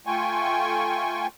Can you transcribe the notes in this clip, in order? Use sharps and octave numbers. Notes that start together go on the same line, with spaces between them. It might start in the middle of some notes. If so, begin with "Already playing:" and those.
A3 F4 G5 G#5 C#6